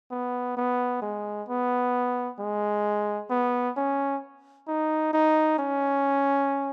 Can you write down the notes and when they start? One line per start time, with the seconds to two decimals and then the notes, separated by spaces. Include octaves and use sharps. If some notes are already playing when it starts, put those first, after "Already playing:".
0.11 B3
0.57 B3
1.02 G#3
1.49 B3
2.40 G#3
3.30 B3
3.77 C#4
4.68 D#4
5.13 D#4
5.59 C#4